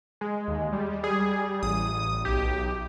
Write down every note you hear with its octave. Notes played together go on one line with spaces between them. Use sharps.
G#3
D#2
G3
G#4
A1 D#6
B1 G4